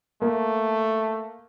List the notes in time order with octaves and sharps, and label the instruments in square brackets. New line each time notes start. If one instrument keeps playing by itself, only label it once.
[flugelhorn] A3 [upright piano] A#3